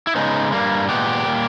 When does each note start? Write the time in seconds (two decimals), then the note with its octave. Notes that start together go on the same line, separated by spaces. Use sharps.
0.07 E4
0.15 C#3 G#3 B3 D#4
0.52 G2 G3 A#3
0.89 A#2 G#3 B3 G4
1.26 A#2 G3 A#3